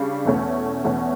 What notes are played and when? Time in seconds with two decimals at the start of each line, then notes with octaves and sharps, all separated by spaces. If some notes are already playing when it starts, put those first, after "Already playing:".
Already playing: C#3 G3 D4
0.25 E2 B2 A3 C#4
0.84 E2 B2 A3 C#4